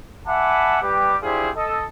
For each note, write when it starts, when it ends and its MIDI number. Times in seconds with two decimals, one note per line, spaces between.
0.27 0.77 76
0.27 0.77 78
0.27 0.77 80
0.27 0.77 81
0.27 0.77 83
0.27 0.77 86
0.81 1.16 55
0.81 1.16 67
0.81 1.16 71
0.81 1.16 79
0.81 1.16 86
1.22 1.50 62
1.22 1.50 64
1.22 1.50 65
1.22 1.50 67
1.22 1.50 68
1.22 1.50 72
1.56 1.82 69
1.56 1.82 75